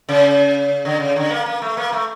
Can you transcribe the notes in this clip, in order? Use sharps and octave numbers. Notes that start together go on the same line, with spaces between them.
C#3
D3
C#3
D3
A#3
A#3
A3
A#3
A3